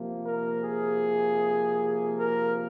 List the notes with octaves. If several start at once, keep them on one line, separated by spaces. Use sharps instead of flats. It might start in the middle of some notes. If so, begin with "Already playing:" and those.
Already playing: C3 F3 A#3
A#4
G#4
A#4